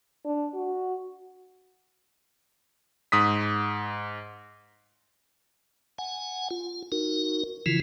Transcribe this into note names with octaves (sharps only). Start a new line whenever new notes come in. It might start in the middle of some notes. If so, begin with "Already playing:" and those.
D4
F#4
G#2 D#6 B6
F#5 G#5
F4
D#4 F#4 A#4
C#3 E3 F3 E4 F4